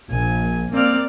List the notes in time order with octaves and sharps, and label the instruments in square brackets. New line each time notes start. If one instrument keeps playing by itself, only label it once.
[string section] A#1 [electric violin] G#5
[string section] A#3 D5 [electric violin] C4 F6